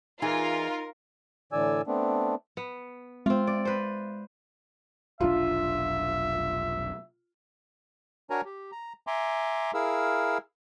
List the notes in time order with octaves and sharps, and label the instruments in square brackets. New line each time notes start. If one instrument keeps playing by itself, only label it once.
[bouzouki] E3 G#3 [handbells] D#4 [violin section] F4 [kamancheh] A#4
[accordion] A2 D3 E3 D5 G#5 E6
A3 B3 C4 D4
[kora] B3
[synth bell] G#3 [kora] C4 F4
[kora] D5
B4 C5
[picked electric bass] F1 B1 D4 [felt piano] F4 [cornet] E5
[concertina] D4 F#4 A#4 C#5 G#5 A#5
G4
A#5
E5 G#5 A#5 C6 D6
E4 G#4 A#4 F5 E6